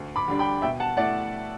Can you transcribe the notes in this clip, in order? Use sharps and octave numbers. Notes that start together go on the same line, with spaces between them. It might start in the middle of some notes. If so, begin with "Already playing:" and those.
Already playing: D2
B5 D6
D3 G3 D4
G5 B5
B2 E5 G5
F#5 A5
A3 E4 D5 F#5